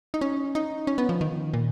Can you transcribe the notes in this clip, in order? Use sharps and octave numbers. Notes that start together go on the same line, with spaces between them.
D#4
C#4
D#4
C#4
B3
F3
D#3
A#2